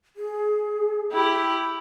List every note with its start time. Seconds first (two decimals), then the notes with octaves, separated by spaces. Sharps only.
0.16 G#4
1.13 E4 G4